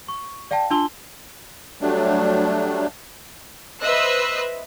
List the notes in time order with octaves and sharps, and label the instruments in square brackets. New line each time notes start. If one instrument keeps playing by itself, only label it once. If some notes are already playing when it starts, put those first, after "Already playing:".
[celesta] C#6
D5 F5 G5 A5
D4 F4 A5 C6 E6 G7
[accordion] F#3 G3 A3 D4
[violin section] B4 C5 D#5 E5 E6 F#6